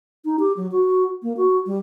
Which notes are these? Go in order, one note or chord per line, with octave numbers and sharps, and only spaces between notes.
D#4
G4
F#3
F#4
A#3
F#4
G3